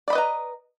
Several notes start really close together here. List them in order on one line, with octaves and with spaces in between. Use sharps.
D5 B5 D#5 B4 A#5